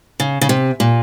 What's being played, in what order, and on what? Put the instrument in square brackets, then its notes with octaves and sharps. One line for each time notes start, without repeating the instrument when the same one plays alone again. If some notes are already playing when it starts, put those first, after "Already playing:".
[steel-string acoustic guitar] C#3
C#3
C3
A#2